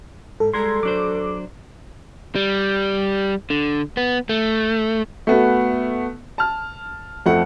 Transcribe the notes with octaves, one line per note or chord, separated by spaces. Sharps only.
G#2 A4
G3 G#3 A4 A#4 C6 G#6 A#6
F#3 D4 C5 D6
G3
D3
B3
A3
A3 B3 F#4
A5 F6
F2 F3 A3 F#5